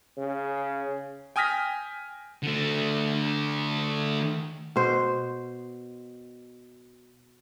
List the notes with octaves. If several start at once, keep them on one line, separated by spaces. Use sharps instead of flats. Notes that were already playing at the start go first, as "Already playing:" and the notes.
C#3
G5 G#5 D#6 F6 A#6 B6
D3 A3
B2 C5